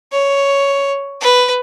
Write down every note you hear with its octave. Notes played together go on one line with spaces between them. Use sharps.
C#5
B4